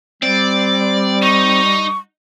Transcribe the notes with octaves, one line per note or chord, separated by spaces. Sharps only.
G3 C4 D5
D#4 C#6